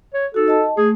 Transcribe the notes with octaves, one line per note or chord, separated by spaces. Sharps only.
C#5
D#4 F#4 A4
D#5 A5
A3 G#4